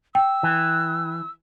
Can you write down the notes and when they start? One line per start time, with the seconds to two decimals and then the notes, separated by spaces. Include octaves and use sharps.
0.15 G5 E6
0.43 E3